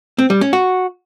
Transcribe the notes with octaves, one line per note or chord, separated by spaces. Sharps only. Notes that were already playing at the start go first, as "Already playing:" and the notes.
C4
G3
C#4
F#4